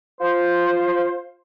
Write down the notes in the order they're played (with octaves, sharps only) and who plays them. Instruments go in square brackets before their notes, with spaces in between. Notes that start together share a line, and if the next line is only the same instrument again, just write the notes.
[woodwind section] F4 C5